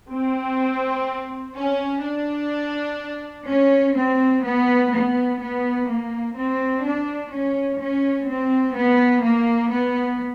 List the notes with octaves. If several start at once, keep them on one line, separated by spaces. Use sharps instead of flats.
C4
C#4
D4
C#4
C4
B3
B3
B3
A#3
C4
D4
C#4
C#4
C4
B3
A#3
B3